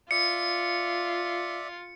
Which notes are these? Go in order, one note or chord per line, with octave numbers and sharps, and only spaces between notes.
F4 D5 E5 C#7